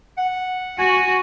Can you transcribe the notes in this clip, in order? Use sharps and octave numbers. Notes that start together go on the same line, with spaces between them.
F#5
F#4 G#5